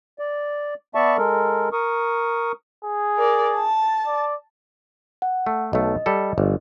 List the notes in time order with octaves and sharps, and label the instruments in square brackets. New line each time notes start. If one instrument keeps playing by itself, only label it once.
[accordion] D5
B3 D5 E5 A5 C#6
G#3 A4 A#4
A#4 C#6 D#6
[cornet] G#4
[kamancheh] A#4 D5
A5
[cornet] D5
[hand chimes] F#5
[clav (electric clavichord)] A3
[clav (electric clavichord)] B1 A3 [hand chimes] D#5
[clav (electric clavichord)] G3 A4
G1